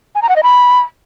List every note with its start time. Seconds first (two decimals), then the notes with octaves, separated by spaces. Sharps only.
0.15 G#5
0.22 A#5
0.29 F#5
0.36 D#5
0.43 B5